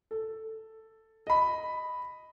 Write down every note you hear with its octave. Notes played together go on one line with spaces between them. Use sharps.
A4
D#5 B5